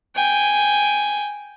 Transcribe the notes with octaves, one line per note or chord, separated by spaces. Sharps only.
G5 G#5